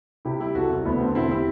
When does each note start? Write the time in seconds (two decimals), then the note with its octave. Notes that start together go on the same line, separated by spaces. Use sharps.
0.25 C3 E4 G4
0.40 G3 E4 G4
0.55 C2 F#4 A4
0.70 C2
0.85 D2 B3
1.00 D3 A3 C4
1.15 E1 C4 E4
1.31 E4 G4